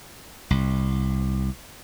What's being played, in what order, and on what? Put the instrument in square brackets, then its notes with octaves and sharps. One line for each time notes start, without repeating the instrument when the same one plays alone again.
[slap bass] C2